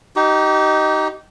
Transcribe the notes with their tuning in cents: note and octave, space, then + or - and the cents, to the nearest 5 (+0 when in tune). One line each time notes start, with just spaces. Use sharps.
D#4 +0 G4 -30